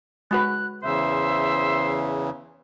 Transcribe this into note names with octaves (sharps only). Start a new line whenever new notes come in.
G#3 F#4 B4 F#6
E2 C#3 C5 E5